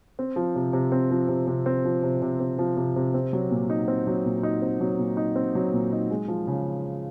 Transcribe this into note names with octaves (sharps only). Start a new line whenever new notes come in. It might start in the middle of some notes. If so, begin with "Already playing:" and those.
C4
F3
C3
C3
C4
F3
C3
C3
C4
F3
C3
C3
C4
F3
C3
C3
C4
F#3
A#2
D#4
C4
F#3
A#2
D#4
C4
F#3
A#2
D#4
C4
F#3
A#2
D#4
G#3
F3
C#3